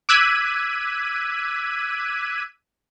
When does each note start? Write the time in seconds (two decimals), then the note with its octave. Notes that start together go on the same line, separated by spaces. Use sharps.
0.09 D6 E6 F#6 G#6 B6 D#7